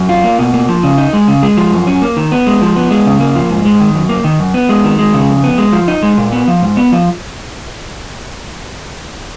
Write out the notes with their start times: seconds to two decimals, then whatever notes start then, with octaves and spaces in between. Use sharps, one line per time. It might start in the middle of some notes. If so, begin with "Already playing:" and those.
Already playing: F#2
0.09 F4
0.24 A#3
0.39 B2
0.54 A#3
0.69 F3
0.83 C#3
0.98 D#4
1.13 G#3
1.28 C#3
1.43 G#3
1.57 F3
1.72 F#2
1.87 C#4
2.02 A#3
2.17 D#3
2.32 B3
2.47 G#3
2.62 F3
2.76 B3
2.91 G#3
3.06 C#3
3.21 A#3
3.35 F3
3.50 G#2
3.65 G#3
3.80 D#3
3.95 F#2
4.09 A#3
4.24 D#3
4.40 F#2
4.54 B3
4.69 G#3
4.84 D#3
4.99 G#3
5.14 C#3
5.29 F2
5.44 B3
5.58 G#3
5.73 F3
5.88 D#4
6.03 G#3
6.18 A#2
6.32 B3
6.48 F3
6.62 G#2
6.77 B3
6.92 F3